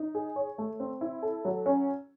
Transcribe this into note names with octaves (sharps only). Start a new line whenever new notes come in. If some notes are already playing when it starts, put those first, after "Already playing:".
Already playing: D#4
G#4
C#5
A3
C4
E4
A4
F#3
C#4